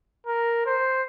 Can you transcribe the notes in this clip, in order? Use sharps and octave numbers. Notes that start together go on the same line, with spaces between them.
A#4
C5